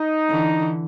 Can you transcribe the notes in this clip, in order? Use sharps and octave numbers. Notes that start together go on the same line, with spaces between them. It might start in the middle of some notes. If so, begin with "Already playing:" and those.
Already playing: D#4
D3 E3